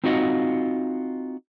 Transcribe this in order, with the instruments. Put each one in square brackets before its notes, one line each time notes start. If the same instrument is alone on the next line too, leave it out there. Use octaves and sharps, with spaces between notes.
[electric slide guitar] C4 D#4 F4 F#4 D#5 F#5